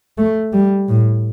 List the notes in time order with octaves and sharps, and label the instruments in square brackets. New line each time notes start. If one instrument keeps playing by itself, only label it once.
[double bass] A3
G3
A2